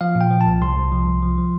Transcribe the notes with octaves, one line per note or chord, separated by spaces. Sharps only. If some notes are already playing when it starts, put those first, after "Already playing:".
F3 F5
A#2
G5
F3
A5
C2
C2 C6
C2
F3
C2
F3
F3